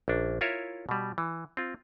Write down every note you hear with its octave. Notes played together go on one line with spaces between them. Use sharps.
A#1 C#4 D4
E4 F4 A#4 C#5 E5
B2 G3
E3
C4 F4